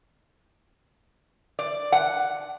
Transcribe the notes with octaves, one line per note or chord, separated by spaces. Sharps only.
D5
F#5